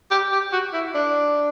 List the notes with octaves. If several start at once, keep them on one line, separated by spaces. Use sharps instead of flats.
G4
G4
F#4
E4
D4